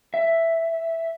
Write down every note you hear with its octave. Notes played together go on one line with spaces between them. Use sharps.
E5